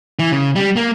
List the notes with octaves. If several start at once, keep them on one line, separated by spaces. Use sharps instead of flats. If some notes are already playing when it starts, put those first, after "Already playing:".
E3
C#3
G3
A#3